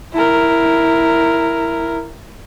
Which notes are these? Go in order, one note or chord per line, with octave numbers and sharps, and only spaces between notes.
E4 A#4